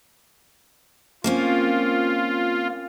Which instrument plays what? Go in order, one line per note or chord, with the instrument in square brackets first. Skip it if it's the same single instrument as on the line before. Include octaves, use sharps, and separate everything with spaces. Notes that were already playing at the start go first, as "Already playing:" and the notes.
[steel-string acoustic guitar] A#3 C4 C#4 [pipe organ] F4